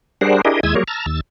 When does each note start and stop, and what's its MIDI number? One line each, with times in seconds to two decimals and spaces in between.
0.21 0.41 55
0.21 0.41 62
0.21 0.41 68
0.21 0.41 70
0.21 0.41 72
0.21 0.41 78
0.45 0.60 62
0.45 0.60 64
0.45 0.60 67
0.45 0.60 68
0.45 0.60 70
0.45 0.60 75
0.63 0.74 39
0.63 0.74 56
0.63 0.74 64
0.63 0.74 80
0.63 0.74 87
0.63 0.74 88
0.75 0.84 54
0.75 0.84 55
0.75 0.84 58
0.75 0.84 68
0.75 0.84 70
0.75 0.84 73
0.88 1.06 81
0.88 1.06 82
0.88 1.06 88
0.88 1.06 89
1.06 1.21 39
1.06 1.21 88
1.06 1.21 93